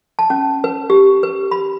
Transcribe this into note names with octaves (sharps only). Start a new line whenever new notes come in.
A5
C#4
B4
G4
B4
B5